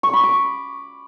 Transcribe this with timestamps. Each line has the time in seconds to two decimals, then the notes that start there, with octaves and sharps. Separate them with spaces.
0.03 C#6
0.13 B5
0.23 D6